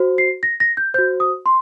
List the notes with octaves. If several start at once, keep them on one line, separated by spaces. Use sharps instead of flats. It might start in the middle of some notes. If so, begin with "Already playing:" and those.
Already playing: F#4 C5
C7
A#6
A#6
G6
F#4 C5 G6
D#6
C6